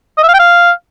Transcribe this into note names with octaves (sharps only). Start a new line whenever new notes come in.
D#5
E5
F5
G5
F5